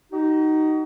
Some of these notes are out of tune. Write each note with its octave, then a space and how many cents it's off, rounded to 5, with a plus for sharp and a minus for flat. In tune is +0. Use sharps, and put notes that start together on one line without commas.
D#4 +0 F#4 +40